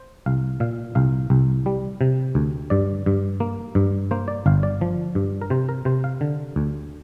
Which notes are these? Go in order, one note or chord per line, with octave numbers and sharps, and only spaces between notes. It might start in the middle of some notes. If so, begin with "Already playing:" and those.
Already playing: C5
C2 F5
A#2 F5
C2 F5
C2
G3
C3
D2
G2 D5
G2
A#3
G2
A#3 C5
D5
G1 F5
D5
F3
G2
A#4
C3 C5
A#4
C3 C5
F5
D3
D2